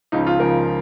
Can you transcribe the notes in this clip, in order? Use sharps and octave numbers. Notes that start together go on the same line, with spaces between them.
C#2 C#3 F3 D#4
F4
C#2 C#3 F3 A#4